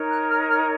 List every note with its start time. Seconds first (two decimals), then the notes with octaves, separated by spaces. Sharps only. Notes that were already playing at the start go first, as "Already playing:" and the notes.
Already playing: D#4 A#4 C#5
0.11 F#6
0.29 F6
0.49 F6